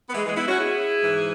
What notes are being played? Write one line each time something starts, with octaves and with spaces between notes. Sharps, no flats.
B3
E3 G#3
E3 G#3
B3 E4
C#4 F#4
E4 G#4
G#2 E3